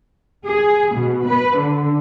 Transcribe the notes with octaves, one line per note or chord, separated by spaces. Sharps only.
G#4
B2
B4
D3